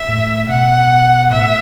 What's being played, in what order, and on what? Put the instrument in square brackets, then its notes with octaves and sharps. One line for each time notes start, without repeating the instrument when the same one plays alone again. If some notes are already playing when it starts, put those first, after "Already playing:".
Already playing: [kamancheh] E5
[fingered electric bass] A2
[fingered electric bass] B2 [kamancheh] F#5
[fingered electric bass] A2 [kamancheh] E5